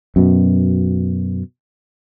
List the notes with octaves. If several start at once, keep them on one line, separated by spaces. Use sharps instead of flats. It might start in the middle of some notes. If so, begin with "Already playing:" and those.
F#2 B2